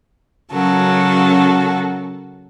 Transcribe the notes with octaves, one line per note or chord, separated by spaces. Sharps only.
C#3 F#3 C#4 F#4 A4 A#4